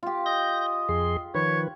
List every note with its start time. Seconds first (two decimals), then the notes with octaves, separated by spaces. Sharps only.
0.03 F4 G4
0.26 D#5 G6 A#6
0.89 F2 G#4 C6
1.35 D#3 F3 B4 C#5